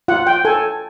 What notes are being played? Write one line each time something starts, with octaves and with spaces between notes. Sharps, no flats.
F4 F#5
G5
A4 G#5